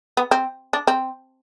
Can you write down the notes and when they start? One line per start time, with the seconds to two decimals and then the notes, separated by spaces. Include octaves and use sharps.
0.17 B3
0.31 C4
0.73 D4
0.87 C4